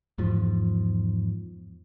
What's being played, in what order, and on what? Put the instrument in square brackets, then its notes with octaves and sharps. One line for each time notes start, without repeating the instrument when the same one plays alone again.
[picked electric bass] E2 G#2 F3